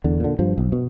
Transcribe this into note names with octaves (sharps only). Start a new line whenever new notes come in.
E2 D3
A#2 D3
G2 F3
B1
B2